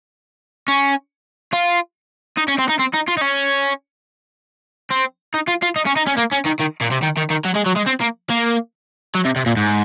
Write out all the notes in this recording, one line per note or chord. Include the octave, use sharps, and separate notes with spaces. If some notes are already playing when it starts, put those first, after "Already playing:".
C#4
F4
D#4
C#4
C4
D#4
C4
D#4
F4
D#4
C#4
C4
D#4
F4
F4
D#4
C#4
D#4
C#4
A#3
C#4
D#3
D#3
A#2
C3
D#3
D#3
D#3
F#3
G#3
F#3
G#3
C4
A#3
A#3
F#3
C3
C3
A#2
G#2